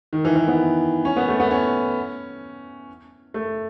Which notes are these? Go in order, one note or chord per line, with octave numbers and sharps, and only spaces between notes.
D#3
E3
E3
B3
C#4
B3
A3
B3
C#4
A3